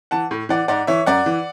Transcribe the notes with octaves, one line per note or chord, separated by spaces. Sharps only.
E3 F#5 A5
A2
E3 D5 F#5
G#2 D5 F#5
E3 C#5 E5
F#2 D5 F#5
E3